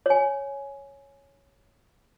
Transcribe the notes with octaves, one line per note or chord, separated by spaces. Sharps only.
C#5 G#5